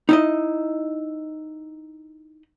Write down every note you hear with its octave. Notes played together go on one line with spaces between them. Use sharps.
D#4 E4 D#5